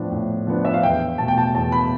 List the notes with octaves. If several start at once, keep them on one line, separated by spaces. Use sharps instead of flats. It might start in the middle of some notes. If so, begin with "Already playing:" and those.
Already playing: A2 F3 B3 D4
A2
F3 B3 D4
E5
F5
E2 G5
B2 A3 A5
G5
A5
E2 A5
B5